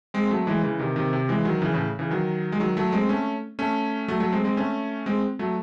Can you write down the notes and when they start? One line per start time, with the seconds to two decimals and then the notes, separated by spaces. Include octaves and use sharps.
0.14 G#3 C4
0.31 F#3 A3
0.47 E3 G#3
0.63 C#3 E3
0.79 C3 D#3
0.96 C3 D#3
1.13 C3
1.29 E3 G#3
1.45 D#3 F#3
1.62 C#3 E3
1.74 A2 C#3
1.99 C#3 E3
2.11 D#3 F#3
2.52 G#3
2.60 D#3 F#3
2.77 F#3 A3
2.93 G#3 C4
3.09 A3 C#4
3.59 A3 C#4
4.08 F#3 A3
4.20 F#3 A3
4.32 G#3 C4
4.44 G#3 C4
4.57 A3 C#4
5.06 G#3 C4
5.39 F#3 A3